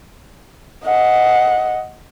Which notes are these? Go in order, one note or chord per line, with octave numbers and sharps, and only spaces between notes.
D#5 F#5